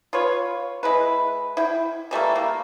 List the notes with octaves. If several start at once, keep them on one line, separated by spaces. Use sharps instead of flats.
F4 B4 C#5
G#3 E4 B4
E4 G5
E3 G3 A3 A#3
A#3